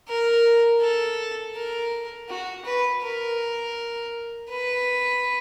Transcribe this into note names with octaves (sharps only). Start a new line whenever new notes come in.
A#4
A4
A#4
F#4
B4
A#4
B4